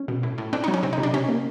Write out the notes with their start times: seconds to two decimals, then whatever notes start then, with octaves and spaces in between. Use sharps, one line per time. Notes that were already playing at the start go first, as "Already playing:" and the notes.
Already playing: C#4
0.08 B2
0.23 A2
0.38 A2
0.53 C4 D4
0.64 D#4
0.68 F#3
0.74 C#4
0.83 C3 C4
0.93 D#4
0.98 C3
1.03 D4
1.13 C3 C#4
1.29 A#3